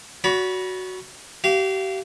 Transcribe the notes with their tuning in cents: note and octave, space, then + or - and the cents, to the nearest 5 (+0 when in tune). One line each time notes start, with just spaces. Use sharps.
F#4 +0 D5 -45 B5 -20
G4 -35 F5 -25